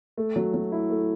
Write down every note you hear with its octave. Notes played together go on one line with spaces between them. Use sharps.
A3
F#3
F#3
E4
A3